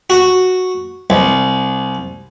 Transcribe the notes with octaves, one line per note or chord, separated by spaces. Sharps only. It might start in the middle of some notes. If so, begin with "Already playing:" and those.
F#4
C2